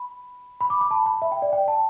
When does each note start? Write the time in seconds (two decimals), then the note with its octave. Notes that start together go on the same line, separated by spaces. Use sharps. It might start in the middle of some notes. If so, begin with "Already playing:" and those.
Already playing: B5
0.61 B5
0.70 D6
0.81 B5
0.91 A5
1.06 B5
1.22 E5
1.32 G5
1.42 D5
1.53 G5
1.68 A5